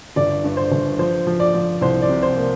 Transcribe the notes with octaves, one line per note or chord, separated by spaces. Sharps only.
G1 D5
G2
C5
G1
F3 C5
F3
D5
F3
C2 C5
D5
C3
C5
A#3